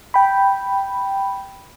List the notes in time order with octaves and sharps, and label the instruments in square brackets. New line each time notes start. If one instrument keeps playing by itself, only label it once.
[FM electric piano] G5 B5